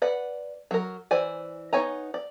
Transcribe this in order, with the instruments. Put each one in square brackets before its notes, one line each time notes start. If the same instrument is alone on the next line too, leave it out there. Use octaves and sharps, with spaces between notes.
[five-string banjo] B4 D5 F#5
F#3 A#4
E3 C5 D5 G#5
B3 D#4 C#5 G#5 A#5
D5